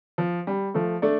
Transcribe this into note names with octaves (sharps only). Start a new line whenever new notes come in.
F3
G3
F3 A3
A3 D4